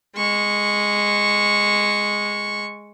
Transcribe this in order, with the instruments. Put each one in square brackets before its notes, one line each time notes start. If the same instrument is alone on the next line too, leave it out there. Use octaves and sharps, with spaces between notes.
[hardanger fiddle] G#3 C#6